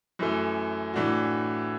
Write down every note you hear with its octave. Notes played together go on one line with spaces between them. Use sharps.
F#2 E3 A3
A2 E3 D4 F#4